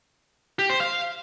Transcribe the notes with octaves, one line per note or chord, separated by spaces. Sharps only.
G4
C5
F5